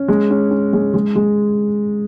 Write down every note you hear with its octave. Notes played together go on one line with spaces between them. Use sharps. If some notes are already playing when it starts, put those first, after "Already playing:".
Already playing: C#4
G#3
C#4
C#4
G#3
G#3
G#3